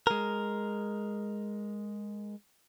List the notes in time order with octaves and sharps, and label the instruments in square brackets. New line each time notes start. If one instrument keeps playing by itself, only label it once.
[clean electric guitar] G#3 A#4